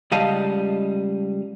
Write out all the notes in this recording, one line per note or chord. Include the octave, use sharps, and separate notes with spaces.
C#2 G3 D#5 F5 A5